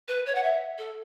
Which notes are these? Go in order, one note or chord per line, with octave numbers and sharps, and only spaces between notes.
B4
C#5
F#5
E5
A4